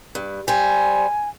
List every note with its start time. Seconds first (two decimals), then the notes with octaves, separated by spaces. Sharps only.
0.15 G2
0.48 G3 C5 G#5